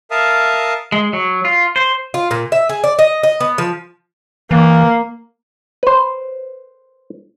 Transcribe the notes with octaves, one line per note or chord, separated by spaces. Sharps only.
A#4 E5 F5 A5 D#6 F6
G#3
F#3
F4
C5
F4
A#2
E5
G#4
D5
D#5
D#5
B3
F3
E3 A#3
B4 C5